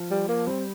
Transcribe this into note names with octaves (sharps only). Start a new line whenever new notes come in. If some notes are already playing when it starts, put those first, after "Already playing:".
Already playing: F3
G3
A#3
G3 C4